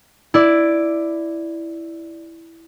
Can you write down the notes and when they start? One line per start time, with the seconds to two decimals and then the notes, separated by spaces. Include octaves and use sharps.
0.34 E4 D5